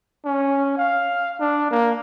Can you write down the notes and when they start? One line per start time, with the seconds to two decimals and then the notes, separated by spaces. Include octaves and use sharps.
0.25 C#4
0.77 F5
1.40 D4
1.71 A#3